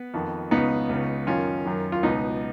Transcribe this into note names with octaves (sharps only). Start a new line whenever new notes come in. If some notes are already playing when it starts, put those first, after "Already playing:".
Already playing: B3
F2 D#3
C#2 C#3 B3 D#4
C#2 C#3
F#2 D#3 C#4 F4
F#2 D#3
F4
C#2 B2 B3 D#4